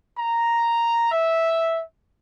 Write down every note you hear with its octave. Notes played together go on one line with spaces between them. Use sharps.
A#5
E5